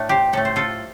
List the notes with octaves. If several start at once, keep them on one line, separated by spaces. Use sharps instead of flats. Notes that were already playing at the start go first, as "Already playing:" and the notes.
Already playing: A2 A3 D4
G4 C5
A2 A3 A4
C5
F4 A4